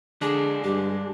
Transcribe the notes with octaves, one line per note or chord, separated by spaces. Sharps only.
D3 G#3 D4 G#4
G2 G4